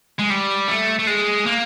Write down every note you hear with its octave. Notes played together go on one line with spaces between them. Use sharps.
G#3
G3
A3
A3
G#3
A#3